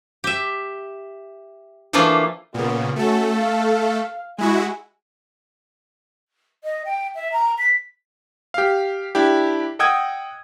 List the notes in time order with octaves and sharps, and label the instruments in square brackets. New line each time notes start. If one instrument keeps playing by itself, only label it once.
[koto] G4 E5
E3 F3 A3 A#3 D4 F4
[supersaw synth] A#2 C#3 [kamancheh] B3
[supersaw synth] A3 A4 [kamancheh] C#4 F#4
[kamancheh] F5
[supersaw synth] G#3 E4 F#4 [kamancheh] G#5
[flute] D#5
G5
E5
A#5
B6
[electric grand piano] G4 F5
D4 E4 G4
D#5 F#5 G5 D#6 E6 G#6